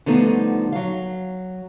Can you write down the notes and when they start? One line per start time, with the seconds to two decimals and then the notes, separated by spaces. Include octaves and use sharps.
0.06 D3 F3 G3 A3 B3 D#4
0.72 F#3 F5